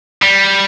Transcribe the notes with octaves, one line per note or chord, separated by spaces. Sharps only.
G3